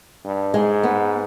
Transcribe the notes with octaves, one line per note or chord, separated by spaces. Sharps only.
G2
G#2 G#3
B3